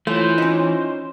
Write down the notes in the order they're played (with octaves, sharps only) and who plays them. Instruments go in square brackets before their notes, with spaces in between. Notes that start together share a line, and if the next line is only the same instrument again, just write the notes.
[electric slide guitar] E3 [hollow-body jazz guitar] A3 [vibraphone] F4 C#5 [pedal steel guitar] C5
[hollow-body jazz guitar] C#4 D#4